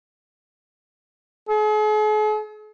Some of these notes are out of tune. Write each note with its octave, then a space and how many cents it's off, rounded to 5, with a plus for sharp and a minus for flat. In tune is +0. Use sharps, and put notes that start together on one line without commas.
G#4 +45